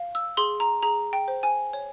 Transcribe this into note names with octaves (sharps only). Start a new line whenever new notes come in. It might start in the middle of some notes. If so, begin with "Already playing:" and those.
Already playing: F5
E6
G#4 C6
A#5
G#4 A#5
G5
C5
G#5
C#5